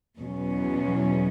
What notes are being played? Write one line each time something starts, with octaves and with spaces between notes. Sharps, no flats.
E2 B2 F#3 C#4